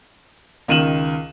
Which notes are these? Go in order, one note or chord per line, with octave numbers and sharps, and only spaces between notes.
C#2 D#3 D#7 E7 F#7